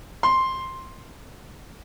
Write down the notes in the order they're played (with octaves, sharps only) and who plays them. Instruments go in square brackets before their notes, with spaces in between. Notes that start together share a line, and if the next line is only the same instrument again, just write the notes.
[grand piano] C6